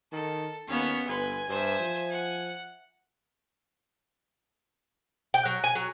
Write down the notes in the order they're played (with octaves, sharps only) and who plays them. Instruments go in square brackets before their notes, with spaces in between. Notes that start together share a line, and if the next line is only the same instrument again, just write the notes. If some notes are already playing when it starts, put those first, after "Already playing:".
[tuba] D#3 [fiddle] A4
[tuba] D#2 [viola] B3 C#4 [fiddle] F5
[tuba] G1 [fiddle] B4 C6 [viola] G#5
[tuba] G2 [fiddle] C5 E5
[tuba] F3
[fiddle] F#5
[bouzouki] G5
F#3
G#5
F#3